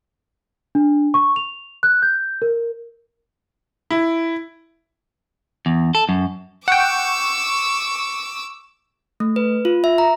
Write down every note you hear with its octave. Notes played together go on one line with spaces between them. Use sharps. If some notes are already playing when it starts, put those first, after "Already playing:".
D4
C#6
F7
F#6
G6
A#4
E4
E2
A4
F#2
F#5 G5 C#6 D6 E6
A3
B4
F4
E5
A#5